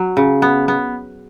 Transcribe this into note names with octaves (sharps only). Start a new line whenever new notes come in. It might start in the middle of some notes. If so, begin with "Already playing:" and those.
Already playing: F#3
C#3
B3
B3